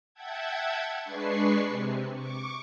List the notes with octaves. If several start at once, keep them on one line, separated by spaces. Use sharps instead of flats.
E5 F#5 G5 A5 G#6
G#3 D4 B4 C#6 C7
C3
C#6 D6